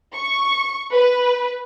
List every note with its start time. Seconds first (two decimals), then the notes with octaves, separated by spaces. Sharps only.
0.14 C#6
0.91 B4